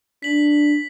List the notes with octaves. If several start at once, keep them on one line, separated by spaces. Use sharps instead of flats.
D4 B6 F#7